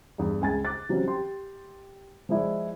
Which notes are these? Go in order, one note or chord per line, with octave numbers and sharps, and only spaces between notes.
E2 G2
C#2 G#5 A6
D6 F#6 A6
E3 F#3 G3 C4 C#4
G4 C6
F3 G#3 E4 D5